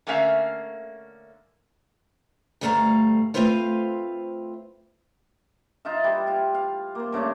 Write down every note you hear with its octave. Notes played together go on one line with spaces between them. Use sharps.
D3 A3 A#3 C#4 E5 F5
D2 G2 G3 A3 F5 A#5
A3 C4 F4 B4 C5 F5
D#4 F4 E5
G3 E4 B4
F4 F5
F5
A#3 C5
G2 C#3 A3 D5